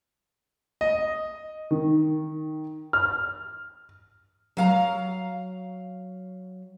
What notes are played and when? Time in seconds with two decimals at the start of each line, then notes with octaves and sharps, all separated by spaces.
0.81 D#5
1.71 D#3
2.93 F6
4.57 F#3 F5 A#5